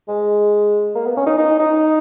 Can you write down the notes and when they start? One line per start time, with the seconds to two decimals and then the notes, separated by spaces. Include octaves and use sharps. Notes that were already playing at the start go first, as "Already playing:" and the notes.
0.08 G#3
0.95 A#3
1.06 B3
1.17 C#4
1.27 D#4
1.38 D#4
1.59 D#4